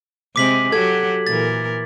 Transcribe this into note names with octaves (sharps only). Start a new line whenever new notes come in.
C3 G#3 C4 D6 B6 F#7
F#3 F#4 G4 A4 G#6
A#2 E3 A#4 A6